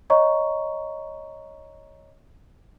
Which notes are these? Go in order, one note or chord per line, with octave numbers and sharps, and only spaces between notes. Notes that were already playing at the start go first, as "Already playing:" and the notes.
C#5 D#5 A#5 C#6